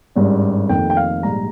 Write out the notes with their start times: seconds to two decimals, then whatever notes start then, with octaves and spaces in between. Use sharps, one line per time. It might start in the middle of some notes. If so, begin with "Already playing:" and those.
0.15 G#1 G2 G3 C#4
0.69 F1 F2 D#3 A#3 G5
0.90 G5
0.97 F5
1.23 A#1 G#2 G3 A#5